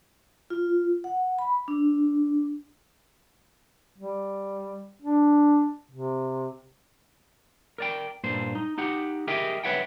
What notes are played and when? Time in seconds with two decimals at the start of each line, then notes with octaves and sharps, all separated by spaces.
0.50 F4
1.04 F#5
1.39 B5
1.68 D4
3.98 G3
5.02 D4
5.91 C3
7.78 A#4 D5 G5
8.24 G2 A#2 C5
8.55 D#4
8.78 D#4 G4 F#5
9.27 G4 G#4 A#4 D#5 E5 G5
9.64 B4 C#5 E5 F#5 G5